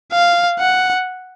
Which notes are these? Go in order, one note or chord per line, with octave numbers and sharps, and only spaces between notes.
F5
F#5